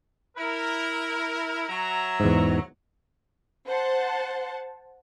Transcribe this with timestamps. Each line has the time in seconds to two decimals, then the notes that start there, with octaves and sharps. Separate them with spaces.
0.36 E4 A#4
1.68 F#3 E5 A#5
2.20 E2 G#2
3.68 C5 F#5 A5